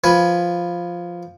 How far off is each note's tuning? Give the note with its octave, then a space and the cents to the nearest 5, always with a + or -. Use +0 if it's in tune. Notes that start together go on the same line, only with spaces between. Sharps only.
F3 +0 B4 +0 G#5 +10